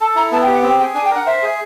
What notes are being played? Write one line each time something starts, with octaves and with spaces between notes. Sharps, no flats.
A4 A5
E4 A#5
B3 A5
G5
G4
F#5
C4 G5
G#4 G5
D4 G#5
G5
A#4
F#5
C5 E5
G#4